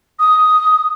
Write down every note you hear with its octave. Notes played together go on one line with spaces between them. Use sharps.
D#6